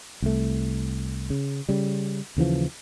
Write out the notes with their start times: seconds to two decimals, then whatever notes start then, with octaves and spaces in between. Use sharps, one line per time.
0.22 C2 A3
1.30 C#3
1.69 C#3 G3
2.37 D#2 C#3 E3 F3